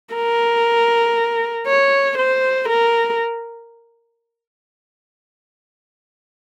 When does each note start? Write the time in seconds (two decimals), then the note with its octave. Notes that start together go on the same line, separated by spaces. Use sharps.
0.15 A#4
1.67 C#5
2.18 C5
2.69 A#4